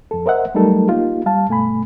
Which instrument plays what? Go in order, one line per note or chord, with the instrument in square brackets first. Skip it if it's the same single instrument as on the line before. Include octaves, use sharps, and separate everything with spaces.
[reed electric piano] F2 A4
A#4 C5 D#5 E5 F#5
F#3 G3 A3 D#4 A4 A#4
A#3 D#4 F4 G4
G3 F5 A5
G2 B2 A3 G#5 B5